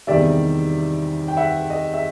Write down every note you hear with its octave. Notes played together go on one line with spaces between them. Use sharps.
E2 C3 D#3 G3 D5 E5
G5
E5 F#5
D#5
E5